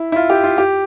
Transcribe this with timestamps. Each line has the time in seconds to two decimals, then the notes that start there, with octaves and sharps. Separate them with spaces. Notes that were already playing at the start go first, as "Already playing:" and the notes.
Already playing: E4
0.12 E4
0.16 F4
0.30 G4
0.44 F4
0.58 G4